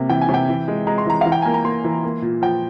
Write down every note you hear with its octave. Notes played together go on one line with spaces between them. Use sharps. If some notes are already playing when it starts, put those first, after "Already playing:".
Already playing: C3 A#3
E3 G5
G#5
C3
G5
E3
G#3
G#3 A#5
C6
E3 A#5
E3 F5
G5
A#3 G#5
A#5
A#3 C6
E3
A#3
A#2
F3 G5